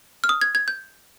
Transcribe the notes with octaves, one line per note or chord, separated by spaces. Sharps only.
F6
D#6
G#6
G#6
G6